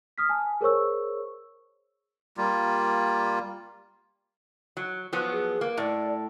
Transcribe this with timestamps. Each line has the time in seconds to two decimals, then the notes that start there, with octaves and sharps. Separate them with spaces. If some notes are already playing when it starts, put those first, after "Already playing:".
0.18 D#6 F6 B6
0.29 G#5 A5
0.61 G#4 A#4 C5 C#5 C#6 E6
2.37 G3 A#3 F4
4.77 F#3
5.13 F3 F#3 B3
5.32 G#4
5.61 A#3
5.77 A2 D5